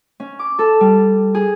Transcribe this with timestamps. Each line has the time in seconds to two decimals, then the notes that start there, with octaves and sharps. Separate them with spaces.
0.20 C#4
0.39 D6
0.59 A4
0.81 G3
1.35 G#4